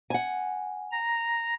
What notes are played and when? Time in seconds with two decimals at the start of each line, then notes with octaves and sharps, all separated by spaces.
0.10 F#5 G#5
0.92 A#5